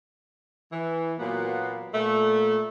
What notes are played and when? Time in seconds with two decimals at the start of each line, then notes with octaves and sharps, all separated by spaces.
0.73 E3
1.19 A#2 F#3 A#3 B3
1.94 A#2 A3